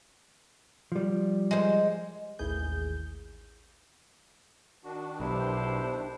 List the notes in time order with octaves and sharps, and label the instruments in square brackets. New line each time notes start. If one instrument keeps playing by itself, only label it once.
[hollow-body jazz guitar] F3 G3
[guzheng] G#3 C5
[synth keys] A1 D#2 E4 G#4 G6
[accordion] D#3 D4 [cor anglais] F#4
[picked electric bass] B1 [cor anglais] E4 [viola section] G4 C5